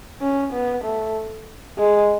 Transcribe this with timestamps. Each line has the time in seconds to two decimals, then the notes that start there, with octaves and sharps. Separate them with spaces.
0.21 C#4
0.53 B3
0.84 A3
1.78 G#3